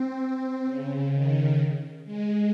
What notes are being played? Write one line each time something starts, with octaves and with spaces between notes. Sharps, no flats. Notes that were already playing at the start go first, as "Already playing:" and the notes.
Already playing: C4
C4
C#3
D#3
G#3